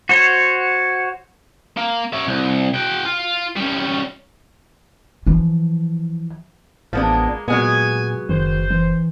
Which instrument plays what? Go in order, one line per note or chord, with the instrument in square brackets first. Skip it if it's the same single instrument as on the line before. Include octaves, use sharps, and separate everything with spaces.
[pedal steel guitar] F#4 C5 C#5
[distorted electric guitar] A#3
C#4 E5
C2
F#4 G5
F4
G3 C#4
[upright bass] E3 F3
[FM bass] A1 [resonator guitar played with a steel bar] F3 B3 D4 [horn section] G#3 A#3
[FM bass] A#2 [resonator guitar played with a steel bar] F#3 G#3 B3 [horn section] G#5
[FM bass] F#1 [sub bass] D#3 [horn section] C5
[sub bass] E3